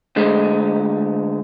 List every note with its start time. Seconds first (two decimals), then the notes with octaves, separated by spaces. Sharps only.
0.16 D2 D3 G#3